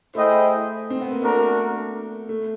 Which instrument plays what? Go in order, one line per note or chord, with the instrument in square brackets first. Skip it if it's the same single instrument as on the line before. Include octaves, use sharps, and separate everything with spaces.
[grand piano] A3 [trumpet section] E4 G#4 C5 D#5 G5
[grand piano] C4
B3
A#3
[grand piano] A3 [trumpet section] D4 F#4 A#4
[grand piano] A3